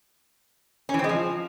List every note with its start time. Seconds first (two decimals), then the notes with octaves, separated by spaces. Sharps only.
0.89 C#4
0.94 E3
0.99 C4
1.04 G#3
1.09 F3